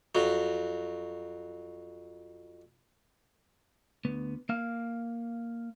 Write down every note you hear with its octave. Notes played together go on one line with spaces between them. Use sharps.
F2 F#3
D2 B3
A#3 F5